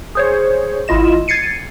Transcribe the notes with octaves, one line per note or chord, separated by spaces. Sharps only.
G#4 C5 C#5
G#1 E4 F4 D#5 E7
G#6 A6 C7 C#7 D#7